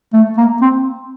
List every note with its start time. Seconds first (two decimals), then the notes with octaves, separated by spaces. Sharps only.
0.13 A3
0.37 A#3
0.61 C4